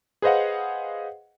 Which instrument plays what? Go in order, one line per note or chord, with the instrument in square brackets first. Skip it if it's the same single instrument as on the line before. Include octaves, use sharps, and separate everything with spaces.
[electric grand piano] G#4 B4 C5 D#5 F5 F#5